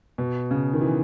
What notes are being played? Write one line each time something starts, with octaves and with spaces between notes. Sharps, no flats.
B2
C#3
D#3
E3